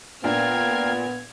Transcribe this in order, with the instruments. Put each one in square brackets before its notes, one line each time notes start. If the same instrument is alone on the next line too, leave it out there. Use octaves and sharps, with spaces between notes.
[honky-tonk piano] A#2 D4 [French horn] B3 [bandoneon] A#4 F5 G5 [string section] F6 G#6